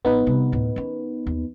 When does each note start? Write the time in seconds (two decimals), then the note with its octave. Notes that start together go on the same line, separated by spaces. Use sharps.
0.05 A1 F3 B3 D#4 B4
0.27 C3 G3
0.52 D2 A2
0.76 D#3 C#4
1.27 D#2